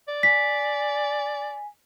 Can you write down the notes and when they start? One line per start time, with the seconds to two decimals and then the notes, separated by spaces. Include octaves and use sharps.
0.08 D5
0.23 G#5 B6